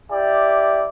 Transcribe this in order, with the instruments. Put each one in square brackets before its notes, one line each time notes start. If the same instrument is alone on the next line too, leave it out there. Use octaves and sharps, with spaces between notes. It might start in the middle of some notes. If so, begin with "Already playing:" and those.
[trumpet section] E4 G4 D5